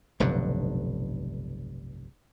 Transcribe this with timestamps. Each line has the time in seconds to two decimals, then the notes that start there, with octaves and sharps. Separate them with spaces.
0.20 F1 B1 G2 D3